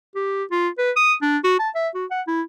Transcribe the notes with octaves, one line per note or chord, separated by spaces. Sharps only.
G4
F4
B4
D#6
D4
F#4
A5
E5
F#4
F#5
E4